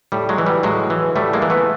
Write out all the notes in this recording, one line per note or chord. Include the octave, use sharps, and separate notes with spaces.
A2 G3
F#3 G#3
E3
G3
A2 F#3 G#3
E3
A2 G3 A3
G#3 A#3
E3
A3 B3